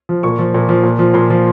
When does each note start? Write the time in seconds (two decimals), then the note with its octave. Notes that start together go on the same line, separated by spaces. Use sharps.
0.09 F3
0.23 A#2 C#6
0.39 F3
0.54 A#2
0.69 F3
0.84 A#2
0.99 F3
1.14 A#2 C6
1.30 F3